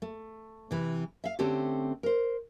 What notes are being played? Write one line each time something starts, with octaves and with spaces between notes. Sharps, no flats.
A3
C3 E3
E5 F5
D3 A3 C4 C#4 G4 A4
A#4 C5